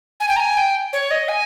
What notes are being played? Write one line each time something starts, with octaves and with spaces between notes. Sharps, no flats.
G#5
G5
A#5
G#5
G5
C#5
D#5
G#5